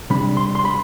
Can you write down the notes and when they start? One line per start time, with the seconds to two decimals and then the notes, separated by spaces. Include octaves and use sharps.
0.10 C3 G3 D4 B5
0.37 C6
0.55 C6
0.65 B5